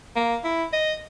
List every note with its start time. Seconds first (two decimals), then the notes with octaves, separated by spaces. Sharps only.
0.16 A#3
0.44 E4
0.73 D#5